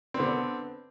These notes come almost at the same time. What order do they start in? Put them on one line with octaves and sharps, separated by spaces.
C4 B3 D3